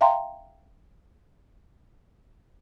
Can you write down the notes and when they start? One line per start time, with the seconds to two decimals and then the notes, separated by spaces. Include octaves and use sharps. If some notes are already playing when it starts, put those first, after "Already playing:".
0.01 E5 F5 G5 A#5 C6